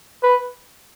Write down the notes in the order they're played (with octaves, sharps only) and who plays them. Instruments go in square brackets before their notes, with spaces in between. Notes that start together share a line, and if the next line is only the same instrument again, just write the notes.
[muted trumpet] B4